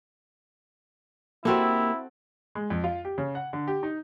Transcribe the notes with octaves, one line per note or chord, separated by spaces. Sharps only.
A#3 C4 E4 F#4 G4 A4
G#3
F2
F4
G4
C#3
F#5
D3
G4
D#4